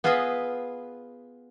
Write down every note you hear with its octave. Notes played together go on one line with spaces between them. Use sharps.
B3 F4 G#4 B4 D#5 E5